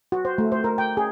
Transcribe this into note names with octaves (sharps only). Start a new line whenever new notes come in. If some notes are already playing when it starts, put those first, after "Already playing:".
F#4
C5
A3
C5
A#4
G5
G#4